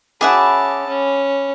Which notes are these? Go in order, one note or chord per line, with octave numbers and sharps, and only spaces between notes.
C#4 G#4 E5 F#5 A5 B5 D6
C#4